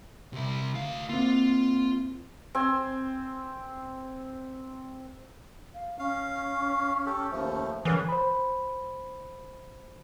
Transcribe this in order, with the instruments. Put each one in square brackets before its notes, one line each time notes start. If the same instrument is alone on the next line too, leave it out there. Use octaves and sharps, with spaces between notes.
[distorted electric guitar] C3 E4
D2 F5
[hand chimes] A#3 C4 [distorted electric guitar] F4
[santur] C4 G#5
[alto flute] F5
[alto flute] C#4 [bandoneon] F5
[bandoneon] G4 A4
D#2 F3 A3
[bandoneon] D3 C#4 G#4 [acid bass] E3 [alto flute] A#4
[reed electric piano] C5 B5